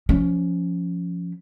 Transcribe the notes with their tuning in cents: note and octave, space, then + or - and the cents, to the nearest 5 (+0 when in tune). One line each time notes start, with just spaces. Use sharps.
F3 +0 C#4 +15